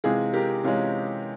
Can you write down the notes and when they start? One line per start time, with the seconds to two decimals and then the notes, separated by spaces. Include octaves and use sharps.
0.04 C3 E3 G#3 F4 G#4
0.34 G4 A#4
0.64 C3 E3 G#3 C#4 F4